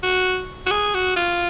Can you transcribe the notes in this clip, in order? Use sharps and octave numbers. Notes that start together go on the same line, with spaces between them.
F#4
F#4
G#4
F#4
F4